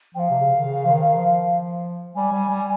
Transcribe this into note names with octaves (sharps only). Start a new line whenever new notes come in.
F3 F5 G5
C3
C#3
D#3
C#3
F3
D#3
F3
G3 G#5
G3
G3